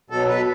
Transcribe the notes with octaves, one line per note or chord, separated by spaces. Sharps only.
B2 F#3 A4
B4